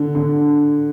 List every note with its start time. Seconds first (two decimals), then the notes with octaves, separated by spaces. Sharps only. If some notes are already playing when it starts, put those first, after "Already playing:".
Already playing: D3
0.15 D3